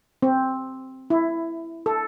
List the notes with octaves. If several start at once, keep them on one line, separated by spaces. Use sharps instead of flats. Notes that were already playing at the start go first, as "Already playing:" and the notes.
C4
E4
A4